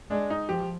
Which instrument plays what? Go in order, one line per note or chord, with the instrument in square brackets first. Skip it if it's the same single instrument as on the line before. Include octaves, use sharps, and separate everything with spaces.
[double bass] G#3 [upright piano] D4
[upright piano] D#4
[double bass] F3 [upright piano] G4